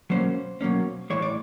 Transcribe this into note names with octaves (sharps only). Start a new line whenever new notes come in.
B2 F#3 A#3 C#4 C5
B2 F#3 A#3 C#4
A2 E3 G#3 C#5
D5